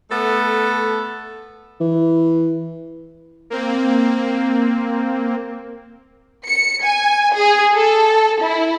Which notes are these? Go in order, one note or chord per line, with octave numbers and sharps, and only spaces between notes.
A3 B3 A4
E3
A#3 C4
C#7
G#5
G#4
A4
E4